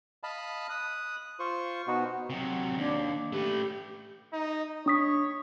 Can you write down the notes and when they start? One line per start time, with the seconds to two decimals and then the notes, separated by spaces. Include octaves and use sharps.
0.23 D#5 F5 A5 B5
0.70 D#6 F#6
1.40 F4 C5 C#6
1.87 B2 B3 D#4 F#4
2.30 C3 F#3
2.78 D#2 D4
3.33 A3 G4 B4
4.33 D#4
4.86 D4 C#5 D#6 B6